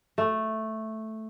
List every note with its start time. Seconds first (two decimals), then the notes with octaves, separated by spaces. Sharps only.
0.18 A3